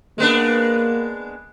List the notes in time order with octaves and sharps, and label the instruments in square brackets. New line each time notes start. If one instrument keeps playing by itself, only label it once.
[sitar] G#3 B3 D4 [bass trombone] A#3